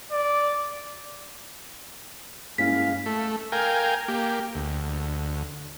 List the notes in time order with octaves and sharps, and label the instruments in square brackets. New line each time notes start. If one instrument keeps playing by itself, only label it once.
[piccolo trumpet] D5
[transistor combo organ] G2 G#3 [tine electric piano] A#3 C#4 E4 [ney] F5 [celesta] B6
[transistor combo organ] A3
A#4 F5 G5 G#5
A#3 G4
D2